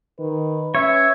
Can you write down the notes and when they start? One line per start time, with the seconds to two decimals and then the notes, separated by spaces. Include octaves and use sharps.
0.20 D#3 B4
0.75 C#4 C#5 E5